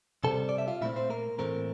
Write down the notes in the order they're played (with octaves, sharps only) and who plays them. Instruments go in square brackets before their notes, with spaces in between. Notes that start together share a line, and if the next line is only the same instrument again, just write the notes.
[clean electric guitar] C3 G3 C4 A4 A5
D5
E5
F4 F5
A#2 A3 C4 E4 E5
C4 C5
A#3 A#4
A2 E3 A3 A#3 C4 A#4